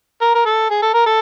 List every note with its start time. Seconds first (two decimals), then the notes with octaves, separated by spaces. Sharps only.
0.21 A#4
0.35 A#4
0.45 A4
0.70 G#4
0.82 A4
0.94 A#4
1.06 A4